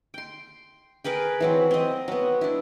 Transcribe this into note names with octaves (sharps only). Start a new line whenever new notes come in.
G5 C6
G#4 A#4 B4 G5
E3 F#3 C4
C4 D#5
F#3 B3
D4 E4